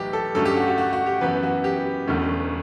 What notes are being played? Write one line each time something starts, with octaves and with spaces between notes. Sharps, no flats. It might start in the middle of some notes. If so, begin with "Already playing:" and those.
Already playing: B1 A2 E3 G4
A4
G2 D3 F#3 A3 C#4 A4
G4
F#4
F#4
F#4
F#4
G4
F#2 E3 B3 B4
F#4
G4
E1 E2 D3 A3 C#4